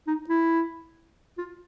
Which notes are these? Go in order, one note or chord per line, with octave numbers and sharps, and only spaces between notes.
D#4
E4
F4